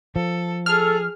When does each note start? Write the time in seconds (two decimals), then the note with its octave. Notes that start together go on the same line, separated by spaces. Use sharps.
0.16 F3 A4
0.66 G#4 A4 F6